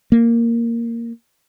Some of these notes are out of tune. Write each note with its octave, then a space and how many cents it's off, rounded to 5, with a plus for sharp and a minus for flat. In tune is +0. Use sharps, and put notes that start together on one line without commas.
A#3 -5